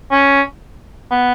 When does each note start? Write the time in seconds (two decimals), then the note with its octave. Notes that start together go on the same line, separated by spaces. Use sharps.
0.11 C#4
1.11 B3